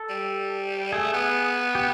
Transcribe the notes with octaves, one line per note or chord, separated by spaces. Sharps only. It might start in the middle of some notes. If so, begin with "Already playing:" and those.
Already playing: A4
G3
A3 G#4
B3
G4